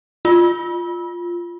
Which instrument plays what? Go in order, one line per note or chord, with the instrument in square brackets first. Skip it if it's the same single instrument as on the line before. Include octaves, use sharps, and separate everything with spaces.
[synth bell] F4